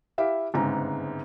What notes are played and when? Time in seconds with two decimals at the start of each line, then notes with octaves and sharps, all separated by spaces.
0.18 E4 G4 E5 F5
0.54 G1 G#2 C#3 C4 A#5